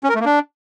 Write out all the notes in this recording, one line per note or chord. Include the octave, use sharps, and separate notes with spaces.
C#4
A#4
A3
A#3
D4